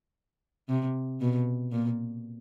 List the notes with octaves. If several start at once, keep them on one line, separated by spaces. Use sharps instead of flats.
C3
B2
A#2